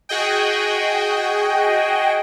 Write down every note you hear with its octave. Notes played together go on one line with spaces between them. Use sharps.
F#4 G#4 D#5 G5